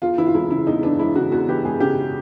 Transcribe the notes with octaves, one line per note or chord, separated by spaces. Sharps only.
E2 F4
E3 E4
F4
E1 E4
C#3 E4
E2 D#4
E3 D4
E1 E4
C#3 F#4
E2 F#4
E3 G4
E1 G#4
C#3 G4